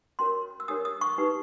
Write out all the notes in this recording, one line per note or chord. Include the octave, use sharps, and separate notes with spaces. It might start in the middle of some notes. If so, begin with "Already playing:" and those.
C#4 F#4 A#4 C#5 C6
E6
D4 G4 A#4 C#5 D#6
D#6
C#6
D#4 G4 B4